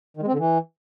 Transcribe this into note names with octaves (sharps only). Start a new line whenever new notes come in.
D#3
G#3
C4
D3
E3